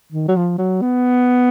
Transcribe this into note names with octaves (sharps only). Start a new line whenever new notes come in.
D#3
F#3
F3
F#3
B3